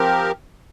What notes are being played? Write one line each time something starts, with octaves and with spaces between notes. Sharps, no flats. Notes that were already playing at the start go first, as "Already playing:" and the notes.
Already playing: F3 C4 G4 A#4